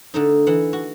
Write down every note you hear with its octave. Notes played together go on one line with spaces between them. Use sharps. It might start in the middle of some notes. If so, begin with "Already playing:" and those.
D3 A3 D#4
E3 F#5
F#4